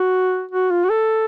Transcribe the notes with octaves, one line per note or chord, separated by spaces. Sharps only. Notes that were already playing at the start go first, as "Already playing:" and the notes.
Already playing: F#4
F#4
F4
F#4
A4